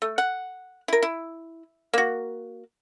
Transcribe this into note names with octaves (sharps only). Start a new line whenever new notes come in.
A3
F#5
E4 A#4
E4
A#3 F#4